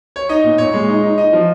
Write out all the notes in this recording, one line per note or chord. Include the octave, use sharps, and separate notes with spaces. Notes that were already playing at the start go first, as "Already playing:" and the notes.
C#5
D#4 D#5
A#2
A#2 C#5
G#3
D#4
D#4
D#4 D#5
F3